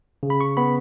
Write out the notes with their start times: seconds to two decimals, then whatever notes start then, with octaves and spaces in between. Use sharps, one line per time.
0.23 C#3
0.30 B5
0.41 C#6
0.57 B3 B5